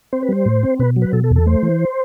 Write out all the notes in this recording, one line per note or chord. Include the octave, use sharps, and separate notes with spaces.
C4 C5
B4
G3 C5
A2
C4
B2 B4
F#3
B4
B2 A4
A4
E2
A4
A3 C5
E3